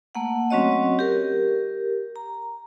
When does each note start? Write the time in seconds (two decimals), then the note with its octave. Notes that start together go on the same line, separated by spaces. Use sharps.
0.15 A3 A#3 F#5
0.50 F#3 C4 C#4 F#4 C#5 D#5
0.99 G4 A#4
2.16 A#5